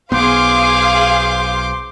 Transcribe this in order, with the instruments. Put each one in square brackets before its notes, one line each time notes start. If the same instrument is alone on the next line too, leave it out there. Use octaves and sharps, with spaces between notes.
[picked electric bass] B1 B3 [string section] G#4 F5 [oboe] C5 [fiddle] C6 D6